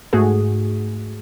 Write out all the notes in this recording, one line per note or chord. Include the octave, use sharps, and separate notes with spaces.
G#2 A3 F#4 G#4